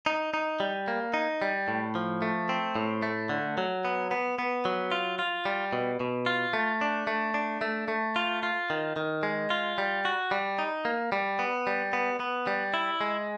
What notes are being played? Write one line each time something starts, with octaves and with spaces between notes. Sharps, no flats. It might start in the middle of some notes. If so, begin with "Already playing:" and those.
D#4
D#4
G3
A#3
D#4
G3
A2
F3
A3
C4
A2
A3
D3
F#3
B3
B3
B3
F#3
F4
F4
G3
B2
B2
F4
A3
D4
A3
D4
A3
A3
F4
F4
D#3
D#3
G#3
F4
G3
F#4
G3
D#4
A#3
G3
B3
G3
B3
B3
G3
E4
G#3